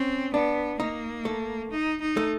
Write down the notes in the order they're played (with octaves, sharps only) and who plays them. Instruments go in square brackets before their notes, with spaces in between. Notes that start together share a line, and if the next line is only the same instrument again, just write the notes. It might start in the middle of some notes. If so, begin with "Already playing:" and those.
Already playing: [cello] C4 [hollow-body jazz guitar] C#4
[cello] B3 [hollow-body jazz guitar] D4
[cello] A#3 [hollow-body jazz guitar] D#4
[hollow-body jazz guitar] A3
[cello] D#4
D#4
[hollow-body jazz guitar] A3